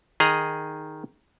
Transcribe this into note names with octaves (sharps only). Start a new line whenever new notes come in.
D#3 G#4 D#5 A#5